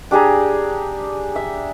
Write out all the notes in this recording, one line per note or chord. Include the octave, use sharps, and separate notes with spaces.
D4 G4 G#4 A#5
E5